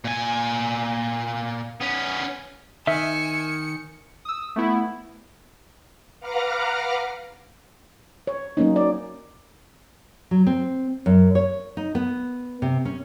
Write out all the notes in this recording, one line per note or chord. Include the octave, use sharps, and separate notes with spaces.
A#2 G#5
B3 C#4
D#3 E5 G#5 E6 C#7
D#6 E6
A3 B3 E4
B4 F5 F#5 A#5 D6 F6
C#5
F#3 A#3 C#4 D#4
D5
F#3
C4
F#2
C#5
D#4
B3
C3
C#4